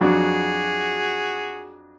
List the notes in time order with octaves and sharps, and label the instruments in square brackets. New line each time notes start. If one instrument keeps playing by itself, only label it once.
[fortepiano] F2 F#3 D4 [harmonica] F#4 G#4